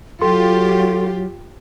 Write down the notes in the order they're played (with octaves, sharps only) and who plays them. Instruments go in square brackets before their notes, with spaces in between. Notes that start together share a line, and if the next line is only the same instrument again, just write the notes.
[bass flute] F#3 [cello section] F4 G4 [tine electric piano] A4 C6